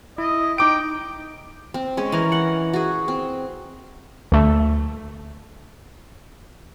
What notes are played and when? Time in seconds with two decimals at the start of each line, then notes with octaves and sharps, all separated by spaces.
0.18 E4 D#5
0.58 D#4 G5 D6 D7
1.74 C4
1.97 G#3 C#4
2.12 E3 A#4
2.32 F#5
2.73 F#4 G#4
3.08 C4
4.32 D2 A3